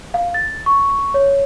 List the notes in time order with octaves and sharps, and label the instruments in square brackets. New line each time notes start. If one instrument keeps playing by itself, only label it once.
[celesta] F5
A6
C#6
C#5